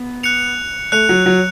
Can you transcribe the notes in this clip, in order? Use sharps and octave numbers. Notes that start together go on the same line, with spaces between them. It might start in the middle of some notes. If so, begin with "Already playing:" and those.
Already playing: B3
F#6 C#7 F7
A3 F#6 C#7 F7
F#3
F#3